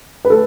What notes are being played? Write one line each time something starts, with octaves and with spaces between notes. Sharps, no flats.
B4
A3 A4